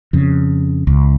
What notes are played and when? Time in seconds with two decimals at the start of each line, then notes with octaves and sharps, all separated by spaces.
0.13 F2 C#3
0.87 C#2